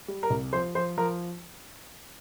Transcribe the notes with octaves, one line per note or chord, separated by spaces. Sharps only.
G3
A#4
C2
F3 C5
F3 C5
F3 A#4